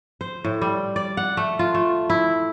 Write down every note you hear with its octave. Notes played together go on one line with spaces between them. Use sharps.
C5
A2
G3
D5
F#5
A3
F4
A3
E4